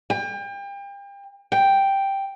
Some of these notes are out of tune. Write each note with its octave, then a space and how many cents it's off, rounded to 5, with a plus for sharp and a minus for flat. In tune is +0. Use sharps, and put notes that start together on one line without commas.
G5 +35
G5 +0